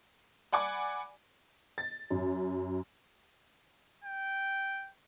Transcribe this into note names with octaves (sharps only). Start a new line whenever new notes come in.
D5 F#5 G#5 B5 D6
A6
F#2
G5